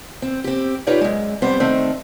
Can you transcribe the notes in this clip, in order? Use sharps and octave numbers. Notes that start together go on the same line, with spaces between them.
C4
C4 G4
D#4 F4 G4 B4 C#5 D5
F#2 G#3
F2 G3 B3 C4 C5
D#3 A3 C4 D4